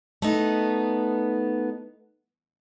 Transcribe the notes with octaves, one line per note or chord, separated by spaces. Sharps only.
A3 B3 D#4